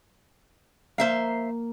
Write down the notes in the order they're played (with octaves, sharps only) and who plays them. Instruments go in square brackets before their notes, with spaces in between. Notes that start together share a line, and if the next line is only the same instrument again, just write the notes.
[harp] A#3 [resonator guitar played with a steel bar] C5 E5 F5